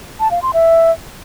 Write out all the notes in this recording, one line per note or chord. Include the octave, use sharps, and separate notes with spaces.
A5
F5
C6
E5